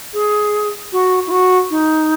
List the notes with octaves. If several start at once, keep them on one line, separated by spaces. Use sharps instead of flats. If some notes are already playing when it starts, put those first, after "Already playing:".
G#4
F#4
E4
F#4
D#4